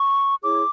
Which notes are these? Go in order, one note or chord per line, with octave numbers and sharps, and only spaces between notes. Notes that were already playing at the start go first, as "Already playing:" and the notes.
Already playing: C#6
E4 G#4 C#5 D6